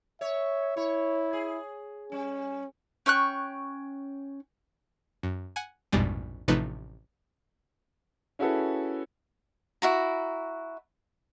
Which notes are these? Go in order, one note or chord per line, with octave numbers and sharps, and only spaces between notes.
C#5 E5
E4 C#5
G#4
G3 C#4
C#4 G5 C#6 F#6
F#2
F#5 G#5
A#1 F2 G#2 B2 G3 G#3
A1 C3 F3 A3 D#4 B4
C#4 E4 F#4 G#4 A4 B4
E4 F#4 A#5